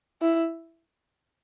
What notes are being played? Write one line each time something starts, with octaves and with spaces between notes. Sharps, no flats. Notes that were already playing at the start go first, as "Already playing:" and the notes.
E4